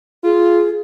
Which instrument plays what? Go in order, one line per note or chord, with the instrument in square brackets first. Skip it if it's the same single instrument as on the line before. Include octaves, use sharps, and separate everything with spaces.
[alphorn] F4 [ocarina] G#4